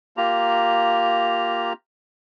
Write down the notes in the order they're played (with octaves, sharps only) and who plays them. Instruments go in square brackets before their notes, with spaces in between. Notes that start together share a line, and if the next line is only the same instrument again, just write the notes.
[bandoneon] A#3 F4 G4 A#5